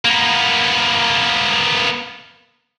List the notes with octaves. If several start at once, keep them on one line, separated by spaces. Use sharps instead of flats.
A#3 B3